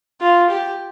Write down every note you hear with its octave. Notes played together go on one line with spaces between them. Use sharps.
F4
G4